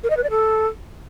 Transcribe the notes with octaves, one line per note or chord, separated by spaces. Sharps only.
A#4
D#5
B4
D5
A4